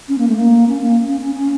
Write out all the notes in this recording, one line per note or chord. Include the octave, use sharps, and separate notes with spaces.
C#4
A#3
A3
A#3
C#4
A#3
C#4
C#4
C#4